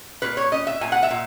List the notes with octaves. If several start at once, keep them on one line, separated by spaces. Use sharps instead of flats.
A#2 B4
C#5
C#4 D#5
E5
A#2 G#5
F#5
E5
A#2